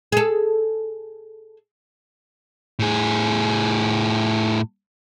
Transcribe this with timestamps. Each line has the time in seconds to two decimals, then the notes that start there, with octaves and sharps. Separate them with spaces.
0.12 G#4 A4
2.79 A2 G#4